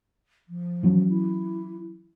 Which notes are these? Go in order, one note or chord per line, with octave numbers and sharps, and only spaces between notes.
F3
E3 F#3 C#4
E4